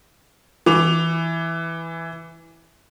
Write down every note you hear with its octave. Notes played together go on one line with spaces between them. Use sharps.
E3 D6 F7